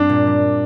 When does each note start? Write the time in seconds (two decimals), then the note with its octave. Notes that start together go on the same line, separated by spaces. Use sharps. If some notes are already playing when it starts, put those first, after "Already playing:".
Already playing: G2 G3 C4 D4
0.09 A#2
0.27 G3